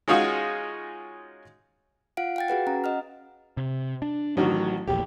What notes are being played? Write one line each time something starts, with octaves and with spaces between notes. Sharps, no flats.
G#3 C#4 D#4 F4 F#4 G#4
F4 F5 F#5 D7
F5 G5 A6
F#4 G#4 B4 F#5
C#4 A#5
D#5 F#5 F6
C3
D4
A1 D#3 F#3 F#4
E1 A#1 A2 G4